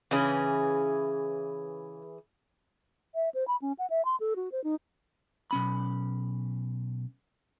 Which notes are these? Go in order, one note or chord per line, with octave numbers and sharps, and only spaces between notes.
C#3 E3 C#4 E4 G#4
E5
C5
B5
C#4
F#5
E5
C6
A4
F#4
C5
D#4
B1 C#4 B5